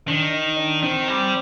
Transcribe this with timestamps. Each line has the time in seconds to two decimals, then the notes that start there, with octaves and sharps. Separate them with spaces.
0.07 D#3 D4
0.33 D#4
0.57 D4
0.83 D#3 C4
1.08 G3